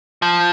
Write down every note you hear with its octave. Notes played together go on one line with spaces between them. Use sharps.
F3